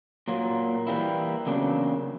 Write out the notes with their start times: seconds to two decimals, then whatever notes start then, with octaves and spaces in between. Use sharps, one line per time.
0.28 A#2 F#3 A#3
0.87 E3 G3 A#3 E4
1.46 E2 C#3 F#3 A#3 D4